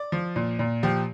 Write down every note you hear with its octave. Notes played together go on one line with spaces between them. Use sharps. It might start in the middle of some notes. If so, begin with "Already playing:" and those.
Already playing: D5
F3
A#2
A#2
F3 G4